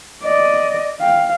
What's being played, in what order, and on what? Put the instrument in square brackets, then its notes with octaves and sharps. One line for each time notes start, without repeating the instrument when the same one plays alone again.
[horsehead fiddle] D5 [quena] D#5
[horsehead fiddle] F5 [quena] G5